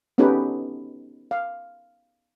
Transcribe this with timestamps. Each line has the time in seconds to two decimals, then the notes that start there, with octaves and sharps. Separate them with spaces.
0.18 B3 C#4 D#4 G4 A4 B4
1.31 F5